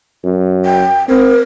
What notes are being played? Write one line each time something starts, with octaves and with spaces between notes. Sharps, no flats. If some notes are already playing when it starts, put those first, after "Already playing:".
F#2
G5
C4 A#4